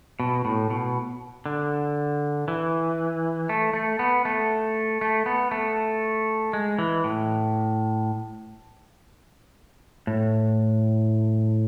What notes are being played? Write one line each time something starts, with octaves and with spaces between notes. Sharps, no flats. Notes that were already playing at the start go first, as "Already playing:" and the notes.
B2
A2
B2
D3
E3
A3
A3
B3
A3
A3
B3
A3
G#3
E3
A2
A2